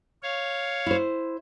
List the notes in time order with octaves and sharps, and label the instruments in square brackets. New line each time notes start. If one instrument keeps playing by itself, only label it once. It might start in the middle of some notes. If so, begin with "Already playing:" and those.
[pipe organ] C#5 F5
[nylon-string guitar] E4 C5